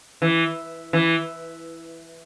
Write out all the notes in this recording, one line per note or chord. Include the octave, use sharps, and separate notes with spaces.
E3
E3